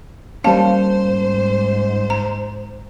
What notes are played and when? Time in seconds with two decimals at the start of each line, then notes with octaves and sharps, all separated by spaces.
0.44 G3 A#3 C#4 C5 F5 A5
1.02 G#2
2.10 A#5